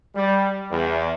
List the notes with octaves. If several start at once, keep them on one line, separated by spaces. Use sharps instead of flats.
G3
E2